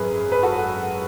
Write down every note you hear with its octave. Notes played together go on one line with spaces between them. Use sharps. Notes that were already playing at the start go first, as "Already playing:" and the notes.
Already playing: G#1 F#2 G#4 B4
B4
F#4 A4